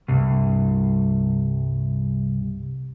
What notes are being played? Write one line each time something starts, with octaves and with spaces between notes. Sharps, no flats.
C2 G2